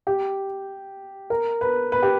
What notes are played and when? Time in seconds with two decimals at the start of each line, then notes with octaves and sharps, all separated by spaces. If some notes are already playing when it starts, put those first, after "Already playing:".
0.07 G4
1.30 A#4
1.61 B4
1.92 B4
2.03 G4